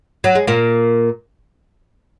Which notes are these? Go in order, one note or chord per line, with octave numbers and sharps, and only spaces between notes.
F#3
G#3
A#2 A#3